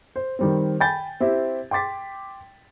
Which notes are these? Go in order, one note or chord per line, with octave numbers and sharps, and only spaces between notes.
C5
D#3 G3 C4
G5 G#5 B5 G6 A6
C4 E4 G4
G5 C6 D6 A6 B6